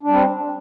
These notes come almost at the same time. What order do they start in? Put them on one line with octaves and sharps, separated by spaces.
D4 G3 C4